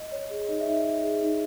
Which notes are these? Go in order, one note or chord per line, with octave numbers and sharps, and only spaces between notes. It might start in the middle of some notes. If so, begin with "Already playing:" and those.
Already playing: D#5
C#5
G#4
D#4 D#5
E5
D#4
E5
C#5 E5
G#4
D#4